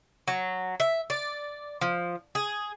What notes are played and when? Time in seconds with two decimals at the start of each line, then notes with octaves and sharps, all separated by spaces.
0.28 F#3
0.80 E5
1.10 D5
1.81 F3
2.35 G#4